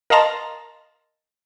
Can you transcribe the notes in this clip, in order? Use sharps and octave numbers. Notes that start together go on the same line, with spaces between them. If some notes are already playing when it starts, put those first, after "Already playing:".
A#4 D#5 F5 A5 A#5 C6